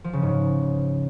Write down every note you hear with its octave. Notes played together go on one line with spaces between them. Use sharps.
F3
C#3
G#2